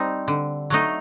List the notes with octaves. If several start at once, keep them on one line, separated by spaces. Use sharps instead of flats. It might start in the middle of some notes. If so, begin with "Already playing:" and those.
Already playing: G3 C4 D#4
D3
F#3 A3 D#4